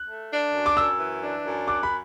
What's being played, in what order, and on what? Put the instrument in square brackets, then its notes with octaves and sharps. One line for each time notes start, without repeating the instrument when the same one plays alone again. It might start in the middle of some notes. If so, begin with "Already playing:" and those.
Already playing: [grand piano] F#6
[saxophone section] A3
D4
F#2
[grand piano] D6
[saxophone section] F#2 [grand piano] E6
[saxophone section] E3
D4
F#2
[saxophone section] F#4 [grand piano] D6
[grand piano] B5